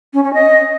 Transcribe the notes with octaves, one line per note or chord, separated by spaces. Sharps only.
C#4
C#4
D#5